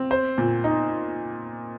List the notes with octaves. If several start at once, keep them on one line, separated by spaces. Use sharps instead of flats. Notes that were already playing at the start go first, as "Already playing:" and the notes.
Already playing: C4
C5
A#2
D#4